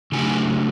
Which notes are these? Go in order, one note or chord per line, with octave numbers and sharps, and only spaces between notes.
C#3 F#3 A3 D4 G#5